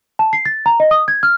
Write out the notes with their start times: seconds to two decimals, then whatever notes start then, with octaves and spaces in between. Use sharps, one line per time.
0.19 A5
0.33 C7
0.46 A6
0.66 A#5
0.80 D#5
0.91 D#6
1.08 G#6
1.23 F6